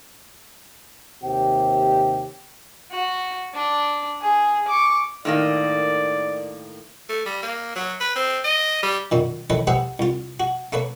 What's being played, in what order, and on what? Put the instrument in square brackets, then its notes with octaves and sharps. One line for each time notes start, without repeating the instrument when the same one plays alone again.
[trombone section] D#2 C3 G4
[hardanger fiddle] F#4
D4
G#4
C#6 D6
[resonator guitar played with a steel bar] A2 D#3 A#3 [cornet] D5
[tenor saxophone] A3
G3
A#3
F#3
B4
C4
D#5
G3
[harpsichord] F#2 A#2 D#3
D#3 E3 A3 B4 C#5
G4 G#4 B4 C5 E5 F#5
C2 F4
F#4
A3 A#3 B4 C#5